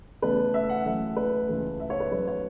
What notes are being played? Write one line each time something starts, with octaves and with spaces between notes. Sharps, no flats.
E2 C#3 A3 B4
E5
F#5
F#2 E3 A3 E5
B4
C#2 C#3 E3 A3
E5
C#5
B4
F#2 F#3 A3 B4
C#5